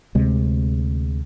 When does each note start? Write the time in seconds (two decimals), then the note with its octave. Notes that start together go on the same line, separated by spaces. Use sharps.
0.15 D2 C3 G#3